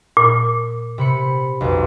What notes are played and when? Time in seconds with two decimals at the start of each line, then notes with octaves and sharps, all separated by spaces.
0.17 A#2
0.98 C3 B5 C#7
1.61 B1 F2